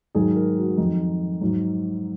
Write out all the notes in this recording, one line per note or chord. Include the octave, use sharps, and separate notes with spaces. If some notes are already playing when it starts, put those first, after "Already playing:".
G#2 D#3 F#3 G#4
A#4
F#4
F2 D#3 F#3 D#4
G#2 F#3